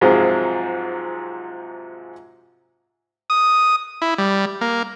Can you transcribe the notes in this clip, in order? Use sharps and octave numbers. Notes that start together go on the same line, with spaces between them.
G#2 C3 F3 F#3 G#3
D#6
E4
G3
A#3